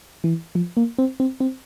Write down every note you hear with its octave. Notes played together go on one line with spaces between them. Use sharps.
E3
F3
A#3
C4
C4
C4